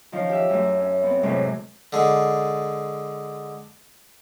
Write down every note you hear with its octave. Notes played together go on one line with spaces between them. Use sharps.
D#3 F3 C#4
G4 E5
F#2 A3
C#4
B3 C4
F#2 A2 C3 G#3 A3 C4
D3 G#3